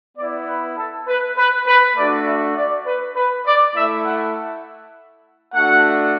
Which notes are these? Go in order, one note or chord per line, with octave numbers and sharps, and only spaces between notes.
B3 E4 D5
B4
A4
B4
B4
B4
A3 D4 F#4 D5
E5
D5
B4
B4
D5
A3 E4 E5
F#5
A3 D4 F#4 F#5